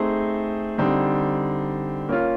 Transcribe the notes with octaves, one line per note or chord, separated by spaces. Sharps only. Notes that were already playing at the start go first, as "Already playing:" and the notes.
Already playing: A3 C4 D#4 G#4 C5
D3 G3 C4 D#4
A#3 C#4 F4